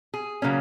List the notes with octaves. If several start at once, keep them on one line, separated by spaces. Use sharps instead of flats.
G#4
C#3 F#3 A#3 C#4